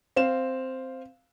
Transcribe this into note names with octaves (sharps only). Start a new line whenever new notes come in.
C4 F5 E7